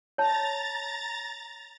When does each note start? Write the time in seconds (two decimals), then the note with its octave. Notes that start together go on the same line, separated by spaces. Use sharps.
0.18 C#5 A5 A#5 A6